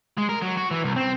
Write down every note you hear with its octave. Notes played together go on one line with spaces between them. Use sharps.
G#3
A#4
F#3
F#4
E3
C2
C4